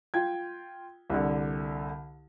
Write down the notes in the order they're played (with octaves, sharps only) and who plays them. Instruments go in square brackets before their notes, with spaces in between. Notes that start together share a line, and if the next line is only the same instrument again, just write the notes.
[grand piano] F4 G5 G#6
C2 D3